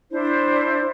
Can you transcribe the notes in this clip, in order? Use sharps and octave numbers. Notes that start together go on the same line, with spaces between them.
D4 E4 C5